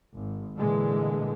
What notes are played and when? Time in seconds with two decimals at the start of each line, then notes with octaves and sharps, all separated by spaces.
0.15 G#1
0.57 A#2 D3 E3 G#3